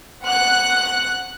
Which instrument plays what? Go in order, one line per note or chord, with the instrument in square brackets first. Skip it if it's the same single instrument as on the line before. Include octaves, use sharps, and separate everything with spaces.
[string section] F#5 F#6